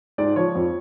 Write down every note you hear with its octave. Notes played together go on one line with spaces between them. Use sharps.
G#2 D5
F3 C#5
F2